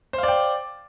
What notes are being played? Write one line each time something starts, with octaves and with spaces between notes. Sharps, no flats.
C5 D5 F5 G5